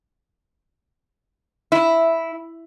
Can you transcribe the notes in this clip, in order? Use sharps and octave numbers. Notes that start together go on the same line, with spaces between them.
E4